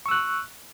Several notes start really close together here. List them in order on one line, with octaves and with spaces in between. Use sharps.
C#6 E6 F#6